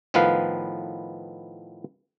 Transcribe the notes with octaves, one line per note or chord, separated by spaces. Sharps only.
A2 D#3 F3 B3 B4 F5